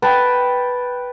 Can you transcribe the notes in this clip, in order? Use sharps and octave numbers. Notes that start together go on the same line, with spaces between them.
B4 G5 A5